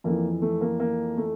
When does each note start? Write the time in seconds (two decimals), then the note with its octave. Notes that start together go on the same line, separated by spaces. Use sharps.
0.04 F2 E3 A#3
0.42 A3
0.61 A#3
0.80 A#3
1.17 A3